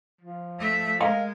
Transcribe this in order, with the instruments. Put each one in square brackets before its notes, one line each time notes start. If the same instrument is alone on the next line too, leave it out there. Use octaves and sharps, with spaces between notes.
[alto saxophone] F3
[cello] A3 E5
[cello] G#3 [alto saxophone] A#4 [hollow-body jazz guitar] D#5 F5 A#5